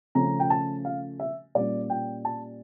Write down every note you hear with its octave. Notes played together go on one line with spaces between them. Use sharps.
C#3 F3 A3 C#4 A#5
G5
A5
F5
E5
A#2 G3 C#4 D5
G5
A5